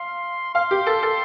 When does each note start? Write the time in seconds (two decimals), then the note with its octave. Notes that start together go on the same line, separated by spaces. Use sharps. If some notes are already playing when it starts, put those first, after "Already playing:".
Already playing: F5 C6
0.55 F5 C6
0.71 G4
0.87 A4
1.03 A4